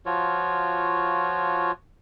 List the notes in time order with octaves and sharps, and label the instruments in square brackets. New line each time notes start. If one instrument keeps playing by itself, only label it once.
[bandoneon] F3 F4 F#4 C#5